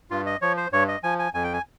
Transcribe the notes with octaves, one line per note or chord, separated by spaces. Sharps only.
G2 F4
D#5
F3 C#5
C5
G2 C#5
D#5
F3 G#5
G#5
F2 G#5
G5
G#5